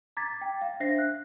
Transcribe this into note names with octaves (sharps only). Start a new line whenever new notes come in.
A#5 D6 G#6 A6 B6
G5
F5
D4 C5 E5 A#6 C7
F#6